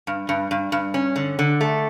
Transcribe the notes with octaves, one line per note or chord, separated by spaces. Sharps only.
G2
G2
G2
G2
C#4
D3
D3
A3